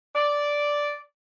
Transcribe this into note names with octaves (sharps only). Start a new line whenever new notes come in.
D5